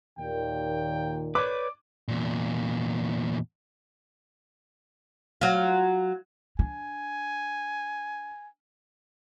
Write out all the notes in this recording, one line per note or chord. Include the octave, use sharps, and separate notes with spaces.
D#2 A#2 D#3 G5
B4 C#5 D5 D6
E2 A#2
F#3 F4
D4 G#5